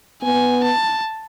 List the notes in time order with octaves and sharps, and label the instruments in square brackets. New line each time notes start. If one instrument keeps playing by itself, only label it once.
[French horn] B3 [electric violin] G#5
[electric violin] A5